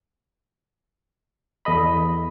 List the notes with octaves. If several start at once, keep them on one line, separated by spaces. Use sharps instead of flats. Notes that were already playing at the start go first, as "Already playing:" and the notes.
E2 A4 D#5 B5